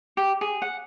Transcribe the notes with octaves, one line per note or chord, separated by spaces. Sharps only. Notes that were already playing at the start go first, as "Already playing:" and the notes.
G4
G#4
F#5